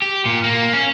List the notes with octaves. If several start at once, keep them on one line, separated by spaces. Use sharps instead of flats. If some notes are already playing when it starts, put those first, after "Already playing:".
G4
A#2
A#3
C#4